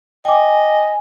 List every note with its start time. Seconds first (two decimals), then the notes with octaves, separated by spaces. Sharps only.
0.25 D#5 G5 G#5 D6